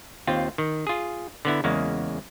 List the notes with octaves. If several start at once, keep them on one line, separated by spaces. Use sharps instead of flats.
D#2 C4 F4
D#3
F4 G#4
D3 B3 E4
E2 C#3 G#3 A#3